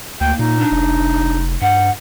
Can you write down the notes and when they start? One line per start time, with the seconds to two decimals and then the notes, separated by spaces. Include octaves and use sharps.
0.21 D2 A#3 G5
0.39 A#2 D#4
0.58 D4
0.72 F1
1.61 G2 F#5